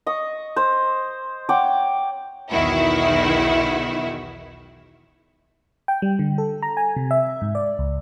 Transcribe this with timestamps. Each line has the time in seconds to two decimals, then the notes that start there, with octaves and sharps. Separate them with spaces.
0.07 D#5 C#6 D#6
0.56 C5
1.49 C#5 F#5 G5 D6
2.51 B1 E2 D#3 E4 F#4
5.88 G5
6.02 G3
6.19 D3
6.38 A4
6.62 A#5
6.77 G#5
6.97 C3
7.11 E5
7.42 G#2
7.55 D5
7.79 C#2